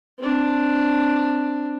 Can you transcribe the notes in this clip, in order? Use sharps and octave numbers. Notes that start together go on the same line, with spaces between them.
C4 D4